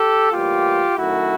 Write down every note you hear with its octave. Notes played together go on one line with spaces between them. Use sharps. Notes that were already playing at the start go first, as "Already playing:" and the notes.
Already playing: G4 A4
A2 E3 G3 A#3 F4 G4
F#2 D#3 F#3 A3 E4 F#4